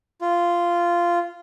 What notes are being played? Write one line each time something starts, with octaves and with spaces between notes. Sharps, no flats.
F4